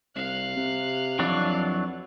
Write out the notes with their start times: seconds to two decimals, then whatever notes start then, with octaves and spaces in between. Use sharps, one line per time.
0.16 C2 F5 F#6
0.57 C3
1.19 F2 E3 F#3 D4